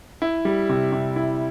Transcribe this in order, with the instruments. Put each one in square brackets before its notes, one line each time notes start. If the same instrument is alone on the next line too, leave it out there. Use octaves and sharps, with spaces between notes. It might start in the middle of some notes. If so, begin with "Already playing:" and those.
[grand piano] E4
G3
C3
C3
E4